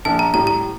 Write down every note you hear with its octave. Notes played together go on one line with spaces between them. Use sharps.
A#1 A5
A#5
A2 G3 A#5
A#5